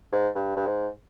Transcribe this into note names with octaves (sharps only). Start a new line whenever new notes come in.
G#2
G2
G2
G#2